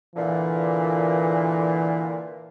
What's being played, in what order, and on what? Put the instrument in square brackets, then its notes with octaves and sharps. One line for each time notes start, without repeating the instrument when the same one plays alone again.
[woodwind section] A#2 D3 [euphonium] E3